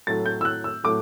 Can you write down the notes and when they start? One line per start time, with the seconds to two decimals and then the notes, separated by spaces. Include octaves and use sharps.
0.07 A2 F#3 A3 A6
0.26 G6
0.41 E6
0.45 F#6
0.64 E6
0.84 A2 F#3 A3 D6